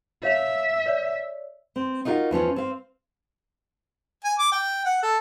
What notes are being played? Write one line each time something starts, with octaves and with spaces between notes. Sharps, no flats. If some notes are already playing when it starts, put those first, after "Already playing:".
C#5 E5 F5 F7
C#5 D5
C4
D#4 F4 F#4 A#4 F5
E2 F3 C#4 F5
C4 F5
G#5
D6
G5
F#5
A4